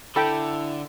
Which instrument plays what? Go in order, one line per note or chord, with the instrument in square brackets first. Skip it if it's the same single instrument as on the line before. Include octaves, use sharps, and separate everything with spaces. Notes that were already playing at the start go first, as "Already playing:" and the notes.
[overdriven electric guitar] D3 [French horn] E4 [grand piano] A4 [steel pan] G5 B5